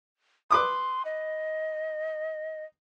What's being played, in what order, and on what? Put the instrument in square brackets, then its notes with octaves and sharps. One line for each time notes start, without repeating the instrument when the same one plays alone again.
[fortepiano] B4 D6 D#6 [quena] C6
[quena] D#5